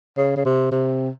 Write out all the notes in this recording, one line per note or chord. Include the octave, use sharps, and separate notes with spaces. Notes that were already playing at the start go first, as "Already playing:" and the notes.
C#3
C#3
C3
C3